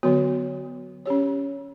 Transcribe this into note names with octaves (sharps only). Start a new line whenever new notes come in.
D3 F#3 B3 F#4 C#5
C#4 G4 C#5